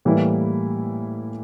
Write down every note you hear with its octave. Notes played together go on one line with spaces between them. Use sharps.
A2 E3 G3 A#3 E4